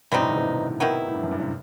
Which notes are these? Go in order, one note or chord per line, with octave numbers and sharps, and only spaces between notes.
G2 B2 E3 G3 C4 D#4
A2 C3
B2 D#3
A2 C3
D#3 F#3 B3 E4
A2
G2
F#2
G2
A2 C3